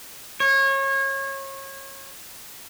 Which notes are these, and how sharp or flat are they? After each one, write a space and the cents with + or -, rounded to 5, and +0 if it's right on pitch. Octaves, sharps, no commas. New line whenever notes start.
C#5 -30